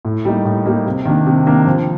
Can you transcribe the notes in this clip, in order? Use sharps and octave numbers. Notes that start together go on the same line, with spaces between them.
A2
G3 A#3 D#4
A2
G3 A#3 D#4
C3
D#3 A#3 D4
C3
D#3 A#3 D4
F3